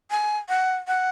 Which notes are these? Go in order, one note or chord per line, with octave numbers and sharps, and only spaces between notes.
G#5
F#5
F#5